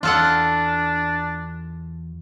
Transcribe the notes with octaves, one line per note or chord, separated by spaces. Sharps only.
E2 D4 F4 A4 F#5